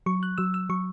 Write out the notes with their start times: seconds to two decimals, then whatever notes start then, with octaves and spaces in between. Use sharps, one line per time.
0.06 F#3 C#6
0.23 F#6
0.38 F#3 E6
0.54 E6
0.69 F#3 C#6